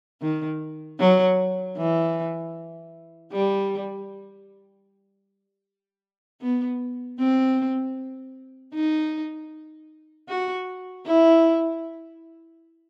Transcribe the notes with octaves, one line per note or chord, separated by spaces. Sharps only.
D#3
F#3
E3
G3
B3
C4
D#4
F#4
E4